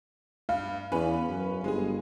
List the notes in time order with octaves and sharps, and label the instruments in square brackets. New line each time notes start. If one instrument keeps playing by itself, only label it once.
[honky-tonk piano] G2 [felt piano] F5
[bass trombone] E2 [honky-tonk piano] C#4 B4
[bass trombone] F#2
[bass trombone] G1 [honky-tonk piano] G#3 G#4